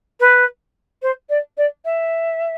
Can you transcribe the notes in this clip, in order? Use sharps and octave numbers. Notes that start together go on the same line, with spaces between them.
B4
C5
D5
D5
E5